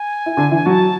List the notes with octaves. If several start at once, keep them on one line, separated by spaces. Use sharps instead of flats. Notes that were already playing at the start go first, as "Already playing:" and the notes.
Already playing: G#5
E4
D3 D4
E3 E4
F#3 F#4 A5